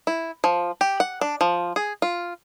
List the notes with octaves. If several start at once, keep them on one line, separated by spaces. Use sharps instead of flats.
E4
F3
G4
F#5
D4
F3
G#4
F4